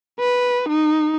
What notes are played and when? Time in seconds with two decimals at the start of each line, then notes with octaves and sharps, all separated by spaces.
0.20 B4
0.69 D#4